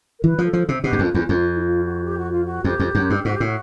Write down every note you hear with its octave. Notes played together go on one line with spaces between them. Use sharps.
A#4
E3 B4
F3
A4
F3
C3
B2 G4
F#2
F2 F4
E2
F2 F4
E4
F4
F#4
G4
F#4
F4
F#4
F2 G4
F2
F#2
G2
G#2 F#4
G4
A2 F#4